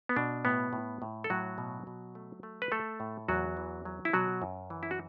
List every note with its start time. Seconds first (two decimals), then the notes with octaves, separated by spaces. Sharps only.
0.09 B3
0.16 B2 D4
0.45 A2 B3
0.73 A2
1.02 A2
1.24 A4
1.30 A2 F#3 F#4
1.58 B2
1.87 B2
2.15 A3
2.43 A3
2.62 B4
2.72 A3 A4
3.00 A2
3.28 E2 F#3 F#4
3.57 E3
3.85 F#3
4.05 E4
4.13 B2 F#3 F#4
4.42 F#2
4.70 E3
4.83 E4
4.91 F#4